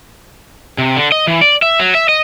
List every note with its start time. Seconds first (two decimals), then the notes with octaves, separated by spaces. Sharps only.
0.78 C3
0.97 D3
1.12 D#5
1.27 E3
1.41 D5
1.62 E5
1.80 F#3
1.95 E5
2.09 D#5